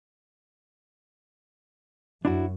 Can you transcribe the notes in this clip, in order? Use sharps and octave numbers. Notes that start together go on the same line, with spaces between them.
F#2 D4 E4 F#4